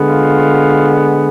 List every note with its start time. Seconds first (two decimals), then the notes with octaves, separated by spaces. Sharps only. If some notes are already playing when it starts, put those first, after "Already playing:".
Already playing: D3 G#3 B3
0.09 F4